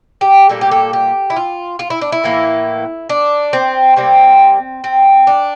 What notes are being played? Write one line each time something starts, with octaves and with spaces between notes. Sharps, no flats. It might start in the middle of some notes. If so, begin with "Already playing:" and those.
G4
A#2 G3 A#3 A4
G4
A4
G4
E4
F4
F4
E4
D4
E4
A2 E3 A#3
D4
C4
C3 G3 A#3 C4
C4
D4